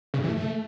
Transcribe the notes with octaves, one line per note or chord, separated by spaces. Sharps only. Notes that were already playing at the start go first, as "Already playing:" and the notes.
C#3
G2
E3
A3